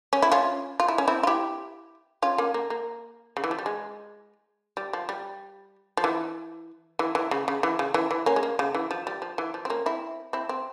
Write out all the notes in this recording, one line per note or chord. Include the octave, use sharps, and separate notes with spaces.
C#4
E4
C#4 F4
F4
E4
C#4
C4 E4
F4
E4 G4
C#4 F4
A#3 C#4
A#3
A#3
C#3
E3
F3
G3
G#3
G3
F3
G3
F3
E3
E3
E3
C#3
C#3
E3
C#3
E3
E3
A#3 C#4
G#3
A#3
C#3
E3
F3
G3
F3
E3
F3
C4
A#3 C#4
C4 E4
C4 E4
C4